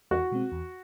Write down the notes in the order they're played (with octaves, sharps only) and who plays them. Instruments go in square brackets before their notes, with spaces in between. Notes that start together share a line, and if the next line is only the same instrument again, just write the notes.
[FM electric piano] E2 [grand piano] F#4
[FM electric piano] B2 G#3 C4
E2